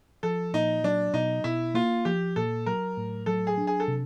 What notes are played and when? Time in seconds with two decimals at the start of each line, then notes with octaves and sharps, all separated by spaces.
0.23 F3 A4
0.53 A#2 D#4
0.84 F#3 D4
1.13 B2 D#4
1.44 B2 E4
1.74 A#3 F4
2.05 F3 G4
2.36 A#2 A4
2.66 F#3 A#4
2.97 A2
3.26 F#3 A4
3.47 G#4
3.58 D4
3.67 G#4
3.80 A4
3.88 C3